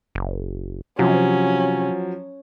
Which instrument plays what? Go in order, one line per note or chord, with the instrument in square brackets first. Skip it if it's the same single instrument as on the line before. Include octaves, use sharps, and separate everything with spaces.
[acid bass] F#1
[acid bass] C3 [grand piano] F3 F#3 [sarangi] C#4